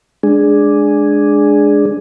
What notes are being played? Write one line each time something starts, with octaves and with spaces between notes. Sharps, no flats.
G#3 D4 G#4